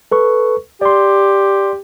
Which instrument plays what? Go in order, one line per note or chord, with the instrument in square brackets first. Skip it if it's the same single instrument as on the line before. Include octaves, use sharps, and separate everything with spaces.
[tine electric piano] A4 B4 C#6
[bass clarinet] G4 [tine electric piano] D5 C6